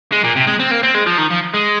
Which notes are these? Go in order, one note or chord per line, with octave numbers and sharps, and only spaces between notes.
G#3
A#2
C3
G#3
C4
A#3
C4
G#3
F3
D#3
F3
G#3